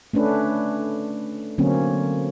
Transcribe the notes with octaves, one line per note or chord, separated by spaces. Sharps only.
A3 C#4 D4 B4
D3 F#3 A#3 C4 C#4